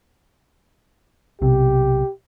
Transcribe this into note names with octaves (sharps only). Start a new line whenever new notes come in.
B1 C3 G4